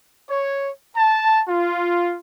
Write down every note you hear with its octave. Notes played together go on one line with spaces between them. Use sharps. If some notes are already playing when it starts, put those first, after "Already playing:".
C#5
A5
F4